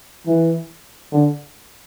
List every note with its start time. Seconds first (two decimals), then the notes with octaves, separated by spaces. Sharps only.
0.26 E3
1.12 D3